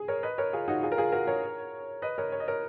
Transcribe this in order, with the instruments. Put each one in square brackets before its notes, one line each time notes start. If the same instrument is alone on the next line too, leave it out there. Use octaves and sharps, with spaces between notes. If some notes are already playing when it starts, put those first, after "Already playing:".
Already playing: [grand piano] G#4
A#4 C#5
B4 D#5
A#4 C#5
F4 G#4
D#4 F#4
F4 G#4
A#4
F4 G#4
F#4 A#4
A#4 C#5
B4 D#5
A#4 C#5
C#5
D#5
A#4 C#5